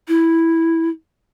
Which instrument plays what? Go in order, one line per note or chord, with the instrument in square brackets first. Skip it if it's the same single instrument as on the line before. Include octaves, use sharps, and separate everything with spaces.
[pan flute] E4